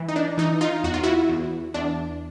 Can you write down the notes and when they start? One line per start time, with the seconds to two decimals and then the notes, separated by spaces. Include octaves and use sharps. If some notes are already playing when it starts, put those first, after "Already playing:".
Already playing: E3
0.08 D#4
0.16 D4
0.38 E3 D#4
0.61 D#4 F4
0.84 E2 F#4
0.94 F4
1.03 E4 F#4
1.29 E2
1.74 E2 D4